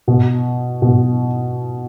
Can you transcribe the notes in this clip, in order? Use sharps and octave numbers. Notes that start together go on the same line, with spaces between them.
B2
B2